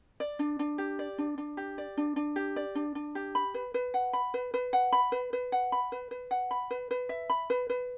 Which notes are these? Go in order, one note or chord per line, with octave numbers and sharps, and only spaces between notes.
D5
D4
D4
G4
D5
D4
D4
G4
D5
D4
D4
G4
D5
D4
D4
G4
B5
B4
B4
F#5
B5
B4
B4
F#5
B5
B4
B4
F#5
B5
B4
B4
F#5
B5
B4
B4
E5
B5
B4
B4